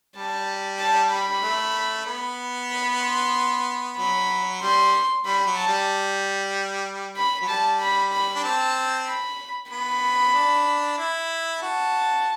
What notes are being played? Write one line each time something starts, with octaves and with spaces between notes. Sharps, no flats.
G3 A5
A5
B5
A3
B3
B5
C6
F#3 B5
G3 C6
G3 B5
F#3
A5
G3
B5
F#3
G3 A5
B5
B5
D4
C4 A5
B5
B3 B5
D4
E4
F#4 A5